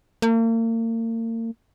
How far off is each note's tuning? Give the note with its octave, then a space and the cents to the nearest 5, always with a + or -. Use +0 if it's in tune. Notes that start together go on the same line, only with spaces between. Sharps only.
A#3 -40